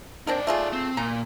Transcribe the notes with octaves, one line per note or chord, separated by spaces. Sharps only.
C4 D4 D#4 A#4 D5
A3 F4 G#4
C4
A#2 A#5